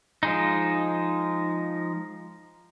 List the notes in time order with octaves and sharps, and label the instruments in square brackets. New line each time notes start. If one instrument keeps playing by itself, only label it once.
[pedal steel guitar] F3 G#3 D#4